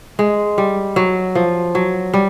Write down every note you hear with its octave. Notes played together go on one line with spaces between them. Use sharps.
G#3
G3
F#3
F3
F#3
G3